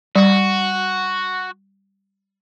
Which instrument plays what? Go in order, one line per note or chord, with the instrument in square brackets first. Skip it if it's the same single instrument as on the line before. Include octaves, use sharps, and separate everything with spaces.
[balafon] G3 [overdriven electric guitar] F#4